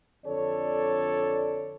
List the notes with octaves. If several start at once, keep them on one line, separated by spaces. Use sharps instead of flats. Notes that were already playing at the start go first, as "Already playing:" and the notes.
F2 D3 A4 C#5 D5